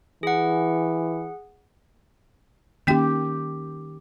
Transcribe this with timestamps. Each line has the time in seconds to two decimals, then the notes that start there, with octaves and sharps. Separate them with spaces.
0.23 E3 G#4 F#5
2.87 D#3 A#3 C#4 G4 G5